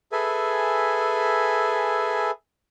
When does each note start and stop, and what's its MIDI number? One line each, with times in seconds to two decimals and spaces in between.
0.12 2.31 68
0.12 2.31 69
0.12 2.31 71
0.12 2.31 76
0.12 2.31 80